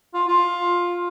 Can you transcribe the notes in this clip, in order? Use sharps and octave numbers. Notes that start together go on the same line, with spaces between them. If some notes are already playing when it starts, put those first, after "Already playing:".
F4
F4